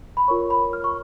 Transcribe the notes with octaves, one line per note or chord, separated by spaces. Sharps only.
B5
F4 A#4 C#5 C#6
B5
F6
C#6